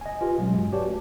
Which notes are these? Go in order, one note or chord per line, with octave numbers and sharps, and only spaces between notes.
D#5 G#5
F4 G4 B4 G#5
B2 F#3 G#3 C#4
G2
F#4 G4 B4 C#5 D5 A5
A3